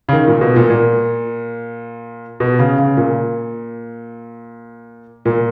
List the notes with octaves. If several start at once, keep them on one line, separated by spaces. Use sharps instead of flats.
C#3
D#3
A#2
B2
A#2
A#2
B2
C#3
C#3
A#2
A#2